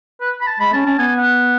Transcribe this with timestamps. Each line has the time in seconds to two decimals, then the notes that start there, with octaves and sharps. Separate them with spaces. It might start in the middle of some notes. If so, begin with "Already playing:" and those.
0.21 B4
0.41 B5
0.47 A5
0.60 G#3 B5
0.73 C#4 A5
0.86 C#4 A5
0.99 B3 G#5
1.18 F#5